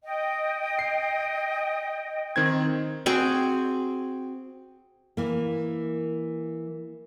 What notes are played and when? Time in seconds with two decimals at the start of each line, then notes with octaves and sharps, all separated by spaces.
0.03 D#5 G5
0.79 C7
2.36 D#3 C4 G#6
3.06 C4 F#4 G#4 G5
5.17 E3 A#3